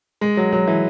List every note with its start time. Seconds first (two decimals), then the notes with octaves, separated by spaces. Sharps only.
0.21 G#3
0.37 F#3
0.53 F#3
0.67 E3